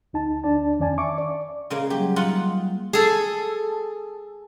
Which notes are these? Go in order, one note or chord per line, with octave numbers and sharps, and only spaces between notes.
D2 D#4 A5
D2 D4 D5 A5
F2 D#3 C#4 D5 G#5 A5
E5 C#6 D6
D5
C#3 G#3 A#3
F#3 G3 A#3 G4
D#4 F4 F#5
G#4 A4